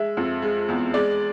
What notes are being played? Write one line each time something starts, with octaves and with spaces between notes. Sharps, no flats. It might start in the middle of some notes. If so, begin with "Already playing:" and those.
Already playing: G#3 E5
F2
G#3
E2
G#3 D5